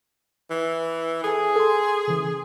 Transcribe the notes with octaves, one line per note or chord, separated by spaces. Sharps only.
E3
G#4 A4 G#5
A4 G#5 C6
C#3 E3